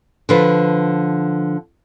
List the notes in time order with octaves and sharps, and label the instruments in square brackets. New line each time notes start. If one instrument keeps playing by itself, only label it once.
[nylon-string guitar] D3 F3 B4